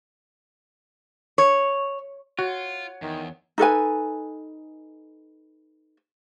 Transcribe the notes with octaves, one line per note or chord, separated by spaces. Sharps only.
C#5
F4 F#4 C#5 F#5
E2 D#3
D#4 A4 B4 G#5